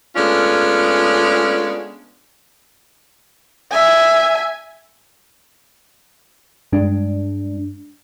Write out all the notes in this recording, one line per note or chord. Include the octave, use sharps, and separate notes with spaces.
G#3 A3 B3 C#4 D4 F4
E5 G#5
G2 G#3 D4